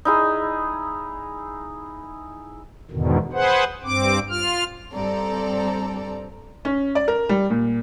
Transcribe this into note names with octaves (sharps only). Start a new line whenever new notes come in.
D#4 E4 G#4
E2 G#2 B2 D3 D#3
G#4 B4 C5 F#5
G2 C4 D6
F4 F6
G2 C4 A4 D5 A#5
C#4
D5
A#4
G3
A#2